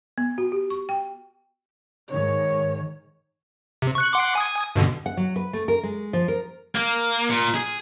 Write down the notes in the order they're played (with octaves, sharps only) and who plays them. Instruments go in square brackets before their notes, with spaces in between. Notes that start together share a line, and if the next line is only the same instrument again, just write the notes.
[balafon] B3
F#4
G4
C#6
G5
[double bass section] G#2 D#3 [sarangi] C#5
[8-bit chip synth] C3
C#6 F#6
F#5 C6 D6
G#5 D#6
G2 B2 D3
[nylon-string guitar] F#5
F#3
B4
A3
A#4
G#3
F3
A#4
[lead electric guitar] A#3
A#2
G#4